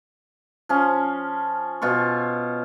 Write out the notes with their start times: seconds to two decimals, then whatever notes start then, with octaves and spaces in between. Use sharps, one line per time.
0.69 F3 C#4
1.82 B2 F4 C#6